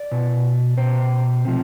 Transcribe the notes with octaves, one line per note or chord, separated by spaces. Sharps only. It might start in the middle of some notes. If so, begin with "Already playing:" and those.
Already playing: D5
B2
B2 C5
C3 F3